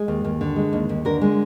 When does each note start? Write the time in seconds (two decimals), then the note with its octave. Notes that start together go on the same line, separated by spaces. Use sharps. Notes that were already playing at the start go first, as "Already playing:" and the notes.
Already playing: G#3
0.08 D#2
0.24 D#2
0.41 D3
0.56 G#3
0.73 D#2
0.89 D#2
1.05 D3 A#4
1.21 G#3